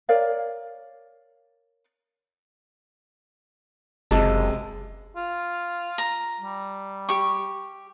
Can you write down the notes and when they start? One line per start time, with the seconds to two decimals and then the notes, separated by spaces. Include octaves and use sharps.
0.09 A#4 C#5 D5 F5
4.11 F#1 C3 G#3 A5
5.16 F4
5.98 A#5
6.40 G3
7.09 G4 C#6